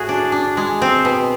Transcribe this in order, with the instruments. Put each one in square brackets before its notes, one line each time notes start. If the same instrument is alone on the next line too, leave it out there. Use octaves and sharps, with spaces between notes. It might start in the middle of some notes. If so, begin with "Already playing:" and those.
Already playing: [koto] A2 F#4 G#4
D4
D4
G#3
C4
B2